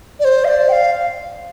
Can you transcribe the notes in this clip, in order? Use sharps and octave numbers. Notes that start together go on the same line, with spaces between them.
D5
C5
F5
D5
G5
F5